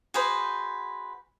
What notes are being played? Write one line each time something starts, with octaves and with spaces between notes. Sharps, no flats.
F#4 G#4 B4 C5